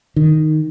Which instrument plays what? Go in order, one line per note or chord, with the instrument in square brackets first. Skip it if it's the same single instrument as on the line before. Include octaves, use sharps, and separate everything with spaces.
[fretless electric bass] D#3